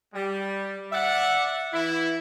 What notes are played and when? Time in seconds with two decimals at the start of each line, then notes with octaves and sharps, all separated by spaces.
0.14 G3
0.92 D5 E5 F#5
1.73 E3 E4